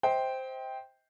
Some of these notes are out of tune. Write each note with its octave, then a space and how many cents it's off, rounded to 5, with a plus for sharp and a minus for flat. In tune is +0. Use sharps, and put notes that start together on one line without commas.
C5 +0 D#5 +45 G5 +0